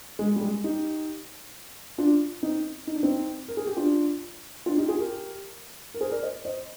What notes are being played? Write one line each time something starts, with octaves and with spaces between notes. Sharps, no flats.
G#3
G3
G#3
D#4 G4
D4 F4
C4 D#4
D#4
D4
C4 D#4
A#4
G#4
G4
D4 F4
D4 F4
D#4 G4
F4 G#4
G4 A#4
A#4
G#4 C5
A#4 D5
C5 D#5
C5 D#5